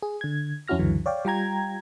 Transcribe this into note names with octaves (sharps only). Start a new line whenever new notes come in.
G#4
D3 G#6
F2 C#4 E4 F#4 F6 A#6
C#2 F#2 D3 E3 F#3
C#5 D5 F5 G5
G3 F4 G5 A#5 G#6